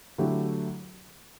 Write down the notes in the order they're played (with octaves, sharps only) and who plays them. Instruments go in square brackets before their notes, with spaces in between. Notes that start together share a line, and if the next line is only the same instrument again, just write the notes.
[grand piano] D3 F#3 A3 E4 G4